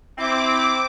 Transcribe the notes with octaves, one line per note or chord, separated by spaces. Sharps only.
C4 E4 D6